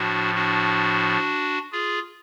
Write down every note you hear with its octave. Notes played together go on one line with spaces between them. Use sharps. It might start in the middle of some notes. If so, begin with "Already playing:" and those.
Already playing: A2 F3 D4 F#4
D4 F#4
F4 G#4